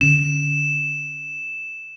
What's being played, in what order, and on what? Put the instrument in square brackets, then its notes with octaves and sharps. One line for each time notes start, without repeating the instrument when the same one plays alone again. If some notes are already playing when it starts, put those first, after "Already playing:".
[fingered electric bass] D3 C#4 [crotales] E7